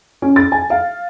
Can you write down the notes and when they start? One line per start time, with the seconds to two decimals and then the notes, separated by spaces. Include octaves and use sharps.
0.22 C#4
0.36 A6
0.52 G#5
0.70 F5